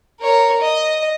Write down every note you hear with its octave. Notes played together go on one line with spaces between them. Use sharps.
A#4 C#5
D#5